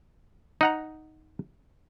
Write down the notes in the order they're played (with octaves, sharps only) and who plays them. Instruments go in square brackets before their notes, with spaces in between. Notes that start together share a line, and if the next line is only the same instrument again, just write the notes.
[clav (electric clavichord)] D#4 F#5 A#5